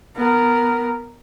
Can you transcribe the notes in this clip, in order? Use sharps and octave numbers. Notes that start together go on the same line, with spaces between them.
B3 A#4